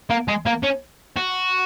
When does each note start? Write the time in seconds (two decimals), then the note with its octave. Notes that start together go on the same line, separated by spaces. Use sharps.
0.10 A#3
0.28 G#3
0.46 A#3
0.63 C#4
1.16 F#4